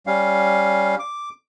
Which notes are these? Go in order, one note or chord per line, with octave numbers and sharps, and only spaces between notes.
G3 C#4 F5
D6